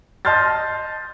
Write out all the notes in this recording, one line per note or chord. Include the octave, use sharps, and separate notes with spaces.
D#5 A5 C6 F6 G6 A6